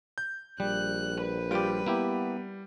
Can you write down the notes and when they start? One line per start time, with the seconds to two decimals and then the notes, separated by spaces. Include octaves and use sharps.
0.18 G6
0.60 A#1 G3 F#6
1.21 B4
1.51 G3 F4 G4 D7
1.86 A#3 B3 E4 G4